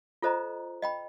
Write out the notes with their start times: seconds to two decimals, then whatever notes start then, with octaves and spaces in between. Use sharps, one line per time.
0.22 F4 A4 C5 D#5 A#5
0.82 D#5 G5 B5